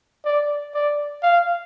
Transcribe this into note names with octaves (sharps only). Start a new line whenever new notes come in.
D5
D5
F5